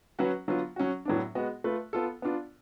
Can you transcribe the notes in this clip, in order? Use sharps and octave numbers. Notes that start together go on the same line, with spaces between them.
F#3 C#4 F#4 B4
D3 F#3 B3 F4
F#3 C#4 F#4
A2 F#3 B3 D4
G#3 B3 F#4
A3 F4 B4
B3 F4 A4
B3 D4 F4